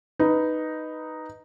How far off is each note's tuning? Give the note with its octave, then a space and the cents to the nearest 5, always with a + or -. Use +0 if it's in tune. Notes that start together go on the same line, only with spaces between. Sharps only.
D#4 +0 B4 +0